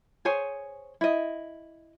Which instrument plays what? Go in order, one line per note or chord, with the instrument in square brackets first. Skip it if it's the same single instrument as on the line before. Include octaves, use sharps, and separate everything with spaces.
[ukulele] G#4 C5 C#5 G#5
E4 D#5